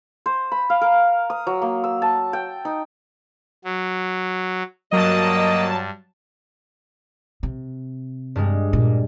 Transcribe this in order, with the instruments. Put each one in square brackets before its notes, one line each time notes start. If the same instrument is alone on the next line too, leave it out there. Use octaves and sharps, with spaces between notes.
[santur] C5
B5
F5
A#4
D#6
F#3
A#3
E6
A5
G5
D#4
[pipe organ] F#3
[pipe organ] G2 [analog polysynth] F#3 A5 [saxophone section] A#3 D#5
[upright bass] C3
[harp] G2 G3 G#3
[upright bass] A#2